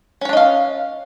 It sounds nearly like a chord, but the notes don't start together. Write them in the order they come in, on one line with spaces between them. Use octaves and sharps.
C#4 C#5 D4 D#5 F5